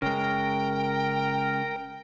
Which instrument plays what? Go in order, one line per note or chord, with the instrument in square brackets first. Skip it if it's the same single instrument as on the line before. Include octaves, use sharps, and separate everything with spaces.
[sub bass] F#1 [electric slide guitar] C#3 G#3 [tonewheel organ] A#4 [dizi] G5